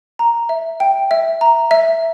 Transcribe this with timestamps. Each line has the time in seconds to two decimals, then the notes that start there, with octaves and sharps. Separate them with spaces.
0.19 A#5
0.49 E5
0.80 G5
1.11 E5
1.41 A#5
1.71 E5